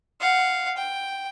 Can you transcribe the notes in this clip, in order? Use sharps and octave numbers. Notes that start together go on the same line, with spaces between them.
F5 F#5
G5